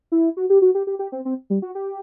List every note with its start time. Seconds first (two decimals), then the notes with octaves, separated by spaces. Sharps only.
0.12 E4
0.37 F#4
0.50 G4
0.62 F#4
0.75 G4
0.87 G4
0.99 G4
1.12 C4
1.25 C4
1.50 G3
1.62 F#4
1.75 G4